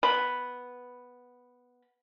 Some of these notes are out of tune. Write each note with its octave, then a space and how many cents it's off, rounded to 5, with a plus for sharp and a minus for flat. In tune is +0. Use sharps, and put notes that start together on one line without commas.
B3 +0 B5 +0